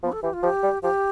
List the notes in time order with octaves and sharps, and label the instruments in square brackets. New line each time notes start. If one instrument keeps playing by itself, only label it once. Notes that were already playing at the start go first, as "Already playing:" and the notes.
[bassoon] F3 [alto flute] B3
[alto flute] A4
[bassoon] E3 [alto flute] G4
[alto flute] F4
[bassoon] F3 [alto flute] G4
[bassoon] G3
[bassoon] F3 [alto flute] G4